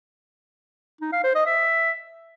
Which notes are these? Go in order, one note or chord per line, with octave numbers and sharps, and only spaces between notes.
D#4
F5
C5
D#5
E5